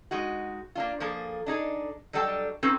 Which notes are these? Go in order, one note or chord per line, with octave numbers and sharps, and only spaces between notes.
G#3 D#4 F#4
A#3 D4 F4
F3 A#3 G#4 A4
D4 D#4 G#4 A4
F#3 G3 D4 A4 G5 A5
C4 C#4 D#4 F4 A4 B4